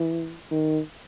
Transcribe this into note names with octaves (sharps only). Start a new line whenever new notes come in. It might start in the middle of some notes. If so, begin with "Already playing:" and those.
Already playing: E3
D#3